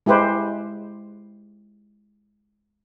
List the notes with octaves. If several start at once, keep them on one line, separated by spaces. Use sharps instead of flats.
G#3 E4 G4 B4 C5